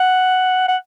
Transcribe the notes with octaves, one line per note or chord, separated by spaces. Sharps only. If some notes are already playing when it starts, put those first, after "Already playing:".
Already playing: F#5
F#5